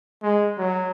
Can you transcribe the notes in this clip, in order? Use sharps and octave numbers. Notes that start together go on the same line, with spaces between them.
G#3
F#3